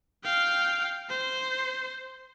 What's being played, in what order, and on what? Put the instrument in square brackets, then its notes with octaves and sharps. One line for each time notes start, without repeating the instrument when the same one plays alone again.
[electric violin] F5 G5
C5